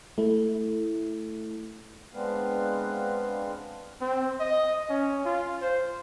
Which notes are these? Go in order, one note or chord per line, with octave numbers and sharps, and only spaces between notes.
A3 E4
G#3 B3 C4 D4 B4 F5
C4
D#5
C#4
F4
C5